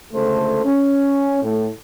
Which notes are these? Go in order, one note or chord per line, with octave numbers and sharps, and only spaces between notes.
C#2 D3 A3 A4 C5
C#4
A2